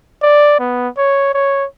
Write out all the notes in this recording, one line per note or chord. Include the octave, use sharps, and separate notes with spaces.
D5
B3
C#5
C#5